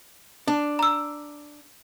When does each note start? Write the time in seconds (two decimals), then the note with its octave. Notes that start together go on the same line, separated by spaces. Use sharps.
0.48 D4
0.79 A#5 E6